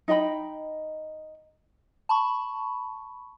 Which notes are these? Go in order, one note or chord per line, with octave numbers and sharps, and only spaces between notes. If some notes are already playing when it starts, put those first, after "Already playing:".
D#4 D#5 G5 B5
A5 B5 C#6